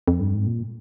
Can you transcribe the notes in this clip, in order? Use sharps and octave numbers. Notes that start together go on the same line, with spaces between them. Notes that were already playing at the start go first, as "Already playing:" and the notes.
F2
G2
G#2
A#2